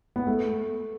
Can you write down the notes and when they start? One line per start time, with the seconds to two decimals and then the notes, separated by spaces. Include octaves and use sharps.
0.16 B3
0.27 A3